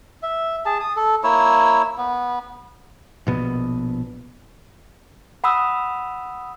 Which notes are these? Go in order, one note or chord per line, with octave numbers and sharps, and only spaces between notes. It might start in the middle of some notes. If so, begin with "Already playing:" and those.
E5
G#4 A5
D#6
A4
A#3 E4 C#5 E6
B3
A#1 B2 B3
F#5 B5 D#6 E6